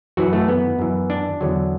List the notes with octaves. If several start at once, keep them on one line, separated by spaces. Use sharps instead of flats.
F#2 E3 F#4
A3
B3
F#2 E3
D4
E2 D3 F#3